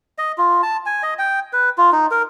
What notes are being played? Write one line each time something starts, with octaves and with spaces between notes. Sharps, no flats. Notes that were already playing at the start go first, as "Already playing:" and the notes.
D#5
F4
A5
G#5
D#5
G5
B4
F4
D#4
A#4